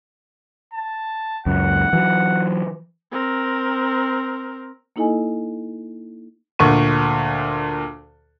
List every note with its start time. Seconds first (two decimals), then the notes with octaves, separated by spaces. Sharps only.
0.73 A5
1.46 C#2 F#2 F#5
1.93 E3 F#3
3.12 C4 A#4
4.96 A#3 D#4 E4 A4 D#5 G#5
6.59 D2 A#2 C#6 D#7